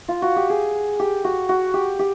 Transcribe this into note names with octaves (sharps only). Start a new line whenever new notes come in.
F4
F#4
G4
G#4
G4
F#4
F#4
G4
G4